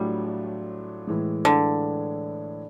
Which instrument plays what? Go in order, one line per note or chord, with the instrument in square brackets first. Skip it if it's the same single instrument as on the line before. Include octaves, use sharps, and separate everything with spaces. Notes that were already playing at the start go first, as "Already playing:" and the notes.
Already playing: [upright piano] A2 F#3 A3 D4 F4 [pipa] G3
[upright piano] A2 E3 G#3
[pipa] D3